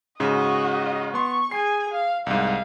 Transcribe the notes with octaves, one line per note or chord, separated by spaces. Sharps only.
G#2 C#3 F#4 D#5
B3 C6 C#6
G#4 G#5 C7
F5
C2 G#2 F5